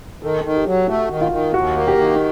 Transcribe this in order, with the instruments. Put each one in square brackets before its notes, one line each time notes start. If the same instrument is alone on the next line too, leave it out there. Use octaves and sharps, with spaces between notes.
[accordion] D#3 [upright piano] A4
[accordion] D#3
[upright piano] G4
[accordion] F#3
[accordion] A3 [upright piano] F#4
[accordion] D#3
[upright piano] F4
[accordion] D#3
[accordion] D#2 [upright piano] F#4
[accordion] A#3
[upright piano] G4
[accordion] D#3